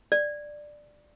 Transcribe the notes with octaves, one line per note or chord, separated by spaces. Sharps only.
D5